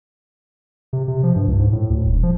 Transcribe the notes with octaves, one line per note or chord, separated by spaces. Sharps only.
C3
C3
F3
G2
C#2
G#2
A2
D2
E1
F3